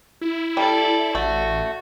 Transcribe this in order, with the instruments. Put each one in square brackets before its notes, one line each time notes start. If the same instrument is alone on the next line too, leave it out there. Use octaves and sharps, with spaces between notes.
[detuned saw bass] E4
[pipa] G3 [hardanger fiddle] A4 D5
[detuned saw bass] A1 [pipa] A3 [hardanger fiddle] F#4